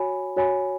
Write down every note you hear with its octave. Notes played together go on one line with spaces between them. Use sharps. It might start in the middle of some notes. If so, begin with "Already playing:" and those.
Already playing: F#4 C#5 G#5 B5
F#4 C#5 G#5 B5